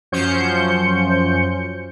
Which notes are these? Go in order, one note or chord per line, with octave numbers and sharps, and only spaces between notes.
F#2 F3 C#4 C5 G6 C#7